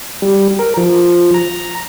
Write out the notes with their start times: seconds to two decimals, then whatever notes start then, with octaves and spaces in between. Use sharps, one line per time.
0.22 G3
0.59 A#4
0.77 F3
1.34 A#5